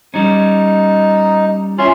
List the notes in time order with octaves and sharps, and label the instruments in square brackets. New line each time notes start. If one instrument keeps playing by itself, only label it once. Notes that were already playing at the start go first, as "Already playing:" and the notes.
[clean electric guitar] G3 C#4 [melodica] D#4
[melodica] C#4 C6 [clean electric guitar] F4 E5